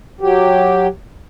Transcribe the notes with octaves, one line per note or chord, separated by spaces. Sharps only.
F#3 G4